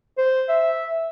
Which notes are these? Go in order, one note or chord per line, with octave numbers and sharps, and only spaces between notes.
C5
E5